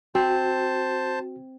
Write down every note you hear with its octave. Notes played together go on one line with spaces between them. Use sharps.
C4 F#4 C5 A5